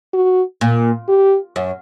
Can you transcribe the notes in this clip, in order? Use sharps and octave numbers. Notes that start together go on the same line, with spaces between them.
F#4
A#2
G4
F#2